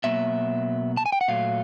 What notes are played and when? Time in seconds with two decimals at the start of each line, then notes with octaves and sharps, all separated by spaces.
0.04 B2 F#3 A#3 E5
0.97 A5
1.06 G#5
1.12 G5
1.21 F#5
1.28 A#2 F#3 A3 F5